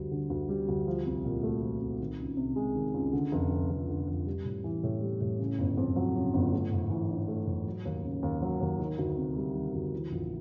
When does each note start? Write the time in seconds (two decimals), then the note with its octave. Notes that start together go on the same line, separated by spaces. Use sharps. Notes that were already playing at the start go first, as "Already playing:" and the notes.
Already playing: D2 G3
0.11 D3
0.30 D2
0.49 G3
0.68 D2
0.87 F3
1.06 C2
1.25 A#2
1.43 A3
1.62 F3
1.81 C2
2.00 D#3
2.19 C#2
2.37 C3
2.56 G#3
2.75 D#3
2.94 C#2
3.13 D3
3.32 F1
3.51 F2
3.70 F1
3.89 D3
4.08 F1
4.26 G3
4.45 A2
4.64 E3
4.83 A2
5.02 G3
5.21 A2
5.40 C#3
5.59 G1
5.77 F2
5.96 F#3
6.15 C#3
6.34 G1
6.52 A3
6.72 G#2
6.90 E3
7.10 D4
7.28 A3
7.47 G#2
7.67 F#3
7.85 D#2
8.04 C#3
8.23 D#2
8.42 F#3
8.60 D#2
8.79 D#3
8.98 D2
9.17 C3
9.37 G3
9.54 D#3
9.74 D2
9.93 E3
10.11 A#1